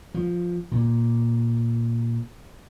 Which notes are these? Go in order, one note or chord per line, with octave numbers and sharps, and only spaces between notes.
F3
A#2